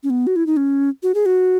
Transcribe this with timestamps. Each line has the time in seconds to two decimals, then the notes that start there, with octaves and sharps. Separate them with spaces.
0.03 C#4
0.10 B3
0.27 F#4
0.36 E4
0.47 D#4
0.57 C#4
1.03 F#4
1.15 G#4
1.26 F#4